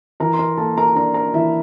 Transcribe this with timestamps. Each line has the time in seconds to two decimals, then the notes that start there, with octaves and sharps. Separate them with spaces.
0.20 E3 A#4 A#5
0.33 C6
0.39 A#4 A#5
0.57 A#3 A4 A5
0.77 A#4 A#5
0.96 D4 A#4 A#5
1.14 A#4 A#5
1.33 E3 E4 E5